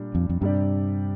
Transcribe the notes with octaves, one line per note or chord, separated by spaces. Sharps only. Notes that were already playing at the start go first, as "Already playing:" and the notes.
Already playing: A#2 G3 D4
F2
F2
G2 C3 G3 D4 G4 D5